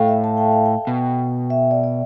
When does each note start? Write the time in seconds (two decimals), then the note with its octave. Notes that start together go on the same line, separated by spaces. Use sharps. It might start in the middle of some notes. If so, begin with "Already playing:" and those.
Already playing: A2 A4 F5 G5
0.08 E5
0.24 A5
0.37 G5
0.52 F5
0.65 G5
0.87 B2
1.50 E5
1.71 D5
1.84 D5